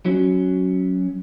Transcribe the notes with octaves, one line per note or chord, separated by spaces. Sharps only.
F#3 C#4